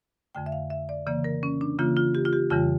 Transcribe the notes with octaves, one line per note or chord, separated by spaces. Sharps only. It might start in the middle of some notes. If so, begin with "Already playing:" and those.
F2 D3 A3 G5
E5
F5
E5
D5
C#3 E3 A#3 D5
A#4
C#4
D4
C#3 E3 A#3 F4
F4
G4
F4
G4
F2 C#3 E3 G3 F4